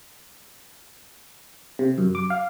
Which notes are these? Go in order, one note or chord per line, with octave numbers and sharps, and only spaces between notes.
C3
F#2
D6
F5